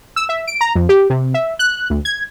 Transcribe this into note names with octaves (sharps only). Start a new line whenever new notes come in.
E6
E5
D7
A#5
F2
G4
C3
E5
F#6
D2
G#6